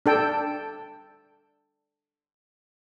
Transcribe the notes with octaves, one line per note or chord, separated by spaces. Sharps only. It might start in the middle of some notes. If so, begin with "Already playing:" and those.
D4 A4 G5